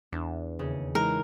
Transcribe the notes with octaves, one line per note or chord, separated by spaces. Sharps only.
E2 D4
D#2 C#3
E3 G#3 D#4 A#4